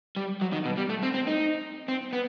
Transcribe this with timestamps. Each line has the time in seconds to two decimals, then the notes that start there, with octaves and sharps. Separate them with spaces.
0.16 G3
0.41 F#3
0.53 D#3
0.65 B2
0.77 G3
0.89 A3
1.03 C4
1.14 C4
1.27 D#4
1.88 C4
2.13 B3